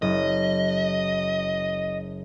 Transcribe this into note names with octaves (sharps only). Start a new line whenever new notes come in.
F#1 D#5